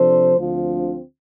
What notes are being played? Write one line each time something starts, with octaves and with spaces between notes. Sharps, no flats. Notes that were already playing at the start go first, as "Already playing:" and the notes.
Already playing: C3 F3 D4 A4 C5
D2 D3 F3 C4 F4